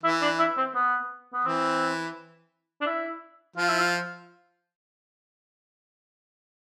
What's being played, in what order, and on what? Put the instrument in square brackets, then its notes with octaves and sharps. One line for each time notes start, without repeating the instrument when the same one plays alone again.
[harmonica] E3 [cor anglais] E4
[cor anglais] D4
E4
C4
B3
B3
[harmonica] E3 [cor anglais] C4
[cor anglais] D4
E4
[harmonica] F3 [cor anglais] F4
[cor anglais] E4
F4